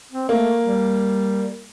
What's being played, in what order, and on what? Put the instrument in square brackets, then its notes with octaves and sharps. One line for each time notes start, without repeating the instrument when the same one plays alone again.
[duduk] C4
[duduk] A3 [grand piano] A#3
[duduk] G3